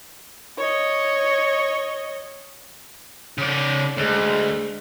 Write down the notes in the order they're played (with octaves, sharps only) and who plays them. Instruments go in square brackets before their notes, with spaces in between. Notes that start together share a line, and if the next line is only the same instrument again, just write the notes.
[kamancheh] C#5 D#5
[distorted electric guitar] C#3 D5
[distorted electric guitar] D2 [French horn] G#3